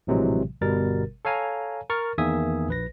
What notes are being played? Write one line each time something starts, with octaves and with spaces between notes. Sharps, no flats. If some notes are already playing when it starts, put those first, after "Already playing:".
A#1 A2 C3 E3 F#3 G#3
G1 B2 G3 A#4 A6
A4 C#5 F5 G#5 A#5
A#4 C#6 F6 A6
E2 D#3 A#3 E5 G#5 D#6
A#1 B4 A#6